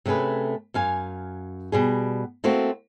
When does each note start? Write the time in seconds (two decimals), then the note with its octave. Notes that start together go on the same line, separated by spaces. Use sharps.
0.06 C3 A3 C#4 G#4 B4
0.74 F#2 F5 G#5
1.72 B2 G3 G#4
2.44 A3 A#3 C4 F#4